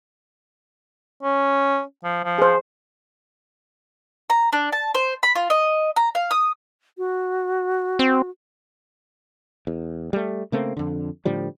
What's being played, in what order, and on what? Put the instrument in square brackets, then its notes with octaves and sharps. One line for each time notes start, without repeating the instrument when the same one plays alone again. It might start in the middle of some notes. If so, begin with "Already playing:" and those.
[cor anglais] C#4
F3
F3
[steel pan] G#4 C5
[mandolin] A#5
D4
A5
C5
B5
F4
D#5
A#5
F5
D#6
[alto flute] F#4
[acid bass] C4
[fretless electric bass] E2
G3 A3
C#3 A3 A#3 C4
F2 D3
A2 D3 F3 G3